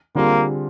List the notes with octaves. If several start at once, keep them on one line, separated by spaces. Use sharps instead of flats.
D3 G3 A#3 C4 F4 G#4